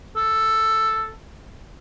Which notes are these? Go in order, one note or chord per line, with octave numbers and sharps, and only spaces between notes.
A4